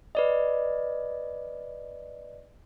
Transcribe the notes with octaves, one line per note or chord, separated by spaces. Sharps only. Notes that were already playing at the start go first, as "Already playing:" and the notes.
B4 D5 D#5